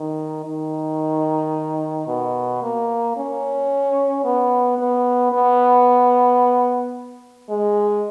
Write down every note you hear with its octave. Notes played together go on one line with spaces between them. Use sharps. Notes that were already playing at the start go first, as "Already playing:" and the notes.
Already playing: D#3
D#3
B2
A#3
C#4
B3
B3
B3
G#3